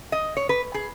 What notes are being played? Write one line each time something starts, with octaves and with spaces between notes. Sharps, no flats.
D#5
C#5
B4
G#4